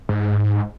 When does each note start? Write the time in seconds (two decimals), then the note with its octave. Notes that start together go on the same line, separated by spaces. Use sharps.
0.09 G#2